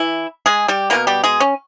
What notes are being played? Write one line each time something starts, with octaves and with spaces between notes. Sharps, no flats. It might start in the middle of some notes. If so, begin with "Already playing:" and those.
Already playing: E3 E4
G#3 G#4
G3 G4
B2 G#3 A#3 B3 A#4
G3 G4
G#3 G#4
C#4